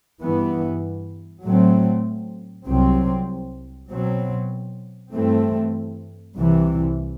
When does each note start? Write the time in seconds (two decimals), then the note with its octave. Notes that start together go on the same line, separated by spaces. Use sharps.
0.20 G2 E3 B3
1.43 A2 F#3 A3 C4
2.67 C2 C3 F#3 C4
3.90 B2 F#3 C4
5.13 G2 E3 A3 C4
6.37 C2 C3 E3